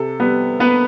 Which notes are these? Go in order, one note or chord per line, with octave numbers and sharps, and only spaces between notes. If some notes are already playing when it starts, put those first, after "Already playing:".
Already playing: C3 A4
G3 B3 B4
A#3 B3 B4